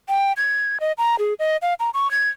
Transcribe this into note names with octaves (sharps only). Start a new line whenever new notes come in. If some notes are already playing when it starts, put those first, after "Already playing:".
G5
G#6
D#5
A#5
G#4
D#5
F5
A#5
C#6
G#6